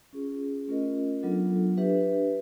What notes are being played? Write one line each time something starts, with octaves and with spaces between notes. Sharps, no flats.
C#4 F4 G#4
A3 C#4 F4 A#4 D#5
F#3 B3 D4 F4 A4
D4 G4 B4 E5